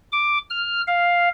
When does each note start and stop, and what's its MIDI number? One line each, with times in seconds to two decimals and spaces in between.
0.12 0.38 86
0.50 0.81 89
0.87 1.29 77